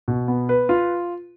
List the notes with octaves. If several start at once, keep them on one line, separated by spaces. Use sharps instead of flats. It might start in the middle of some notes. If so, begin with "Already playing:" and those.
B2
B3
B4
F4